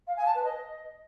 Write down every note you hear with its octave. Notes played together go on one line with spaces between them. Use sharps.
F5
G#5
A5
B4
D#5